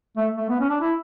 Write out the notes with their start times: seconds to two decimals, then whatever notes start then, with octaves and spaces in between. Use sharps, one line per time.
0.17 A3
0.37 A3
0.49 B3
0.60 C#4
0.70 D4
0.81 E4